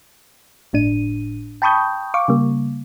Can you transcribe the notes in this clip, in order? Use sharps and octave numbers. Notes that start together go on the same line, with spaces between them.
G1 A2 D4 D#7
G5 A5 B5 C#6 D#6 G6
F5 C#6 D6
C#3 G3 A#3